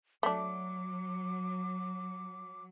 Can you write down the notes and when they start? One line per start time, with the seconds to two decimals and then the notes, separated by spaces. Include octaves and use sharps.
0.23 F#3 A3 D4 D6